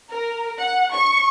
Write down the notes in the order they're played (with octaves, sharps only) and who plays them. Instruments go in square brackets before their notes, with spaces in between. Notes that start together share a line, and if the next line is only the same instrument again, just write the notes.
[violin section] A#4
F#5
C#6